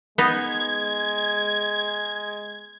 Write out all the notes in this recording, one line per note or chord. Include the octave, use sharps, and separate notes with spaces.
G#3 B3 D#4 G#6